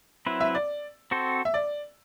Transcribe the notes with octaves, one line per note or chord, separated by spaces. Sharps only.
F#3 C4 E4 B4
E5
D5
C4 F#4 A4 C5
E5
D5